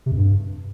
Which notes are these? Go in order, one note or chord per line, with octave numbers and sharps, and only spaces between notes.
C3
F2
G2